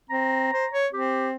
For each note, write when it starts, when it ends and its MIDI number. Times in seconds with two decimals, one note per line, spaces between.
0.10 0.53 60
0.10 0.80 82
0.54 0.66 72
0.72 0.87 73
0.93 1.36 60
0.93 1.28 67